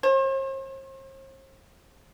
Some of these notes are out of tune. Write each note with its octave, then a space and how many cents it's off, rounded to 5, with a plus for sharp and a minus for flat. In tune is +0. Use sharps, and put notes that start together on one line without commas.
C5 +45